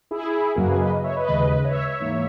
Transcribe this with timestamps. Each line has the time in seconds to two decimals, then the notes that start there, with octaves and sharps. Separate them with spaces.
0.11 E4 G#4
0.55 F#2 C#3 F#3 A#3 F#4 A#4
0.68 G#4 B4
0.80 B4 D#5
1.04 C#5 E5
1.16 B4 D#5
1.28 D#2 C#3 G#3
1.55 D#5
1.64 C#5 E5
2.00 G#2 E3 A#3